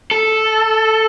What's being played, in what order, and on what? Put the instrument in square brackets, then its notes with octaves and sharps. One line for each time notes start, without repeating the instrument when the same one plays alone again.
[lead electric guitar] A4